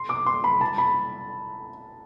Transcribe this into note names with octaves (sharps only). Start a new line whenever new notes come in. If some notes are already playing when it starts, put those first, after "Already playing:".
Already playing: C6
D6
C6
B5
A5
B5